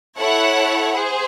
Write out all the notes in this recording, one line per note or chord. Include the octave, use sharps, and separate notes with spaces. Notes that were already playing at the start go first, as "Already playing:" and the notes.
E4 A4 C#5 F#5
G#4 C5